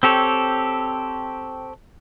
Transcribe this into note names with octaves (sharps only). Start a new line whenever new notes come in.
C4 G4 A4 C#5